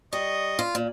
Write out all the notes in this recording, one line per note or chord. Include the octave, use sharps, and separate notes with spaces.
G3 D#5 C#6 D#6
F4
A#2